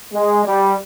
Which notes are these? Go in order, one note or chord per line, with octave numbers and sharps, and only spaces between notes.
G#3
G3